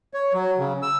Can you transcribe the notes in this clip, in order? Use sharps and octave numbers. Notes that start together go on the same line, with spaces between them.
C#5
F#3
C#3
E6